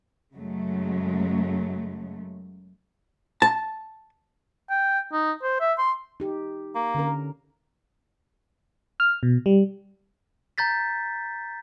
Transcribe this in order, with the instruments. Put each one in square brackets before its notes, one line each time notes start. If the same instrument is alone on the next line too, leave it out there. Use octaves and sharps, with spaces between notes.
[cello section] F#2 C#3 F#3 G#3 A3
[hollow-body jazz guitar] A5
[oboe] G5
D#4
C5
E5
C6
[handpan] D#4 G4
[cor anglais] A#3
[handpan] D3 C#4 A#4
[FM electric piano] F6
B2
G3
[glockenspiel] A#5 G6 A6 B6